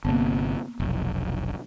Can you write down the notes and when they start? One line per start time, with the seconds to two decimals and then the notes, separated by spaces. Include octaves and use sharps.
0.05 G1 C3 A#3 B3
0.80 F1 B1